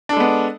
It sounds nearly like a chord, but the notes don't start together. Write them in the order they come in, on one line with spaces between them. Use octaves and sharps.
D4 A4 G#3 B3